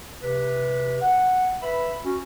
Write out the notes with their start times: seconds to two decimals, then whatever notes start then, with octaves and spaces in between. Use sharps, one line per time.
0.22 C3 B4
1.01 F#5
1.61 B4 E5 B5
2.03 C#4 F#4